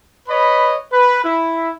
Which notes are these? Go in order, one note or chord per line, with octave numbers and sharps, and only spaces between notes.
B4 C#5 D#5 B5
B4
E4